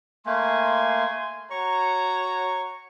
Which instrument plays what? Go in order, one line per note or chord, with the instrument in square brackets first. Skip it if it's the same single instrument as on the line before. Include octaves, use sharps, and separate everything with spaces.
[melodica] A3 A#3 [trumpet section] G#5 C6
[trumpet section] F#4 C#5 A#5 [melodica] C#6